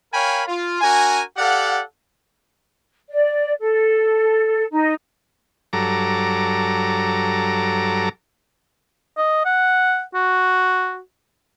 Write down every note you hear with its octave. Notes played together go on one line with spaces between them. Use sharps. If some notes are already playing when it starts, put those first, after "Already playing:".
A#4 C#5 F5 G5 G#5 B5
F4
D4 F#4 A#4 G#5
G4 A4 D5 F5 F#5
D5
A4
D#4
G2 F#3 A4 A#5 D6
D#5
F#5
F#4